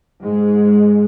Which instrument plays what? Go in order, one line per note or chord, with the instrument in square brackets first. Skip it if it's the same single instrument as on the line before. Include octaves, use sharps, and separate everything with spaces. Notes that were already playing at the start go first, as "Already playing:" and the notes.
[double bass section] G#2 G#3